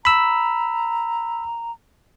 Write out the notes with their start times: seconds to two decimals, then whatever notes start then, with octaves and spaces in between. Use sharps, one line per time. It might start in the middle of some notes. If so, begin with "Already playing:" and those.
0.05 A#5 B5 E6